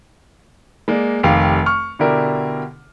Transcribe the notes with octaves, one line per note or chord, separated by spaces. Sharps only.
G#3 A#3 D5
F1 D#3 G4 F5
C#6 F6
B2 D3 D4 E4 G4 A#4